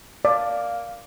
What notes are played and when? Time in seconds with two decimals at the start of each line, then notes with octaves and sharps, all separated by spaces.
0.25 A#3 D5